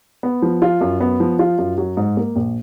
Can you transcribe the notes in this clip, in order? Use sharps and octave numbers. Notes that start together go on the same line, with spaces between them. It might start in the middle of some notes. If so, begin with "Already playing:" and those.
B3
F3
F4
F#2
B3
F3
F4
F#2
F#3
G#2
A#3
A#1